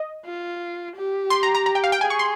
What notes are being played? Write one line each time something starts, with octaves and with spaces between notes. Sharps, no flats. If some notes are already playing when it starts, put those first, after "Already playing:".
Already playing: D#5
F4
G4
C6
A#5
A#5
A#5
G5
F5
G5
G#4 G#5
C#6
C6